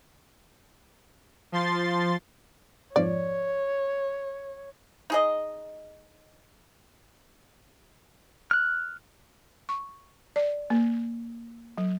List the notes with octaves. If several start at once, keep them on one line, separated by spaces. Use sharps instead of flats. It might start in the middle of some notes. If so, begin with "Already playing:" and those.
F3 C6 A6
F2 G#2 F3 C#5 D5
D#4 G#4 D#5
F6 F#6
C#6
D5
A#3
F#3